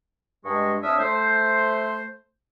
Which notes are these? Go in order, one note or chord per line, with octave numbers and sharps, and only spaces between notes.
G2 G#3 C#6
F2 D4 C#5 E5 D#6 F6
A3 C5